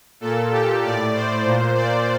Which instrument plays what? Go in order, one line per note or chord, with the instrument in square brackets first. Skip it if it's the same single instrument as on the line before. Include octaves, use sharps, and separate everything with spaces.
[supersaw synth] A#2 A4
G4
A2 D5
C5
A#2
D5